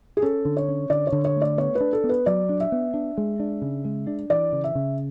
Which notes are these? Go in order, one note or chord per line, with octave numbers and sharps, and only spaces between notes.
G#4
C#4 A4
D3
C#5
C#4
D3 D5
C#5
D3
C#5
A3
D5
B3 C#5
B4
D4
A4
B3
B4
F#3 D5
D4
E5
B3
D4
G#3
D4
C#3
G#3
D4
E3 D5
C#3
E5
C#3